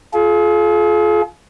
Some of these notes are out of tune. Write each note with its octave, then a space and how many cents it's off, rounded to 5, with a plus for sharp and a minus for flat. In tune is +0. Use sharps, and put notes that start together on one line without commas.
F4 -5 G#4 +45